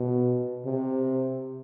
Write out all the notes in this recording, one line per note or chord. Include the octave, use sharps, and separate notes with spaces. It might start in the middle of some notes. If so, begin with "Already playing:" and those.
Already playing: B2
C3